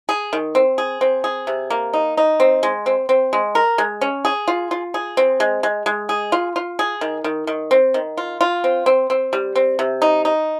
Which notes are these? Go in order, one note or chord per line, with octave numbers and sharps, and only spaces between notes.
G#4
D#3
C4
G#4
C4
G#4
C3
A#3
D#4
D#4
C4
G#3
C4
C4
G#3
A#4
G#3
C#4
G#4
F4
F4
G#4
C4
G#3
G#3
G#3
G#4
F4
F4
G#4
D#3
D#3
D#3
C4
D#3
F4
F4
C4
C4
C4
G3
C4
C3
D#4
D#4